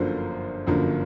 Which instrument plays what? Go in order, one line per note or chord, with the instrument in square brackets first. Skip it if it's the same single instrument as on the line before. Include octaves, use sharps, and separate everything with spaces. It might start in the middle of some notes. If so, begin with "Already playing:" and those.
Already playing: [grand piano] G1 F#2 D3 F3 A#3 C5
G1 F#2 D3 F3 A#3